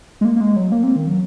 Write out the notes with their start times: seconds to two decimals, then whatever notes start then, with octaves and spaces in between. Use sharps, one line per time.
0.21 G#3
0.25 A#3
0.36 A#3
0.41 G#3
0.56 F#3
0.72 A#3
0.83 C4
0.96 D#3
1.07 F#3